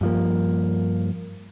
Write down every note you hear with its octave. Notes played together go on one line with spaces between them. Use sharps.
G2 F3 A#3